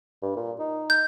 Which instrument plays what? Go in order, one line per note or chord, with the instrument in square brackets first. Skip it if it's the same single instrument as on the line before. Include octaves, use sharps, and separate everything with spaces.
[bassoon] G2
A#2
D#4
[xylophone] G6